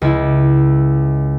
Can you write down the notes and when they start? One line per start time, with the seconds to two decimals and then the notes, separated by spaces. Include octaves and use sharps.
0.02 C#2 E4